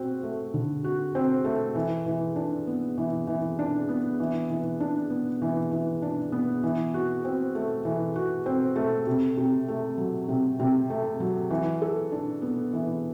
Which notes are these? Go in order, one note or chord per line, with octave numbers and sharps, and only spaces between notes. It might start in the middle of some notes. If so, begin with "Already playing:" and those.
Already playing: C4 F#4
A3
D3
F#4
C4
A3
E3
E3
D4
B3
E3
E3
D4
B3
E3
E3
D4
B3
E3
E3
D4
B3
E3
F#4
C4
A3
E3
F#4
C4
A3
C3
C3
A3
F#3
C3
C3
A3
F#3
E3
A4
D4
B3
E3